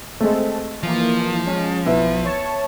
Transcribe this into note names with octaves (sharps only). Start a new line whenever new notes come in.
G#3 A3 C4 A4
E3 F3 A#3
G#3 C#4
B1 B3 E4
C#5 A5 C#6